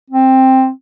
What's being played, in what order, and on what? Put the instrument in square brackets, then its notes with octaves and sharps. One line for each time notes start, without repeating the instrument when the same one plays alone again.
[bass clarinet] C4